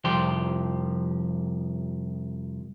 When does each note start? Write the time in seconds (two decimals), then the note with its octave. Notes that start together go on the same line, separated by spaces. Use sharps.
0.04 C2 F2 F3 G4 C6